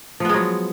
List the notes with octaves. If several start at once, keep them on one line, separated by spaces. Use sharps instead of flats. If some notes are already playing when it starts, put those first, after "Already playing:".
F3 F#3 G#3 B3